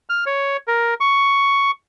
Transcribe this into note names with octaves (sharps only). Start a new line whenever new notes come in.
F6
C#5
A#4
C#6